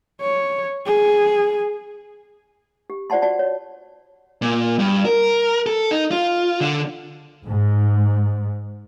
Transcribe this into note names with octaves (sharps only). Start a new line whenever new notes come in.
C#5
G#4
G4
F4 C5 D5 F#5 A5 C6
F#4 D5 A5
C#5
A#2
G2
A#4
A4
D#4
F4
D3
G#2